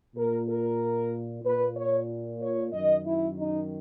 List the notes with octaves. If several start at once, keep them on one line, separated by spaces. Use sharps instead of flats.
A#2 A#4
A#4
A#2 B4
C#5
C#5
F#2 D#3 D#5
E4
D#4